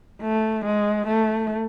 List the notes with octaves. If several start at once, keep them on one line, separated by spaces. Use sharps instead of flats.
A3
G#3
A3